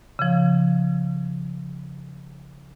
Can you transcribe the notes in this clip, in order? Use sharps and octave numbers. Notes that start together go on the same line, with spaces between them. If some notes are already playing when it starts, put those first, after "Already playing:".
C#3 F3